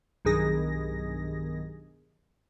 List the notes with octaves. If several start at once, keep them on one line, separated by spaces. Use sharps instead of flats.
B1 G2 D#3 G#4 A#6